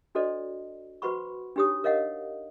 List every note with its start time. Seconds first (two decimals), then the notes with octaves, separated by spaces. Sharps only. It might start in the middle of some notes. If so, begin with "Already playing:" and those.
0.15 D4 F#4 A4 C5 D5 D#5
1.02 F#4 B4 C5 F#5 B5 C#6
1.56 D4 D#4 G4 C#5 D#6
1.84 A#4 C#5 D#5 F5 F#5